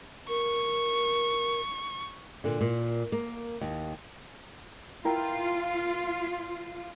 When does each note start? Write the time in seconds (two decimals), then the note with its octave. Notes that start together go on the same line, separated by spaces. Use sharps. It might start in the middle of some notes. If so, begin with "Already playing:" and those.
0.29 A#4 C#6
2.44 A#2 D3
2.61 A#2
3.12 A#3
3.61 D#2
5.05 E4 F4 A#4 G5